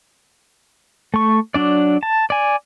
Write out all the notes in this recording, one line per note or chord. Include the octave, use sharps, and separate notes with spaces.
A3 C#6
F#3 D4 D5
A5
D5 G#5